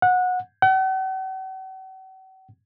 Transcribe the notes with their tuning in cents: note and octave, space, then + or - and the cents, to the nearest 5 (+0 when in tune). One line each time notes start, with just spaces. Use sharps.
F#5 -20
F#5 +45